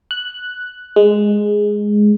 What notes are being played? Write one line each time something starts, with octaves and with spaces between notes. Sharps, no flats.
F#6
G#3